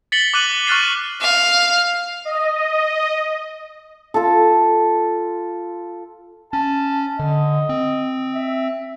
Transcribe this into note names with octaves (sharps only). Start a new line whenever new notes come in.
A6 B6 C#7 F#7 G7
D6 F#6 D#7 F#7
C#6 F6 F#6 A6 C7
F5
D#5
F4 A4
C#4 A5
D3 D#5
C4
E5